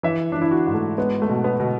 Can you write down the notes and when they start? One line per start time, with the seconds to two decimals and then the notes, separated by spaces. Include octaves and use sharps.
0.03 E3 E5
0.32 E3 D4
0.42 E4
0.51 F#4
0.67 G#2
0.74 A3
0.98 G#3 B3
1.22 A3
1.29 B2
1.44 B3
1.60 B2